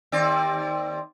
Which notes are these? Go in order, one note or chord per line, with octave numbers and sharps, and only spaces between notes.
D#2 C4 D5